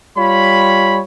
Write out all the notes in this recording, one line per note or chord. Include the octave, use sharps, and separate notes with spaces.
G3 F4 C#5 B5